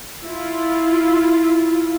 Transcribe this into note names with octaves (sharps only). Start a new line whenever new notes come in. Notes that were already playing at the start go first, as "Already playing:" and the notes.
E4 F4